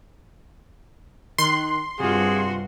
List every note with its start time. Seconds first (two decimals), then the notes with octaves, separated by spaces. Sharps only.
1.38 D#3 C6 F#6
2.00 G2 C3 F4 F#4 G#4